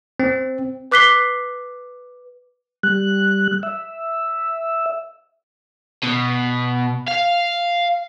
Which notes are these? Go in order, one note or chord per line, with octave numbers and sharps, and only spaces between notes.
C4
B4 D6 F#6 B6 C7 G7
G3 F#6
E5
B2
F5